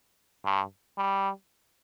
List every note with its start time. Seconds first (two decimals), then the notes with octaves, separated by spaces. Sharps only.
0.45 G2
0.98 G3